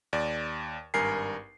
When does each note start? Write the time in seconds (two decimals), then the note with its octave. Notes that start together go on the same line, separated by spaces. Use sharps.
0.13 D#2 D5
0.94 G#1 G2 A#4 G#5 C7